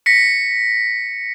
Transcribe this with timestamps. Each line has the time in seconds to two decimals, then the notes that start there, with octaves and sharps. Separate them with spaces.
0.06 A#6 B6 C#7